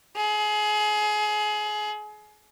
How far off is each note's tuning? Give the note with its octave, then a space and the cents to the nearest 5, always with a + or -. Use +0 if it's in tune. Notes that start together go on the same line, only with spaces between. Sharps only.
G#4 +25